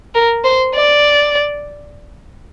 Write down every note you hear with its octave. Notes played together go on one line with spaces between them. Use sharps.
A#4
C5
D5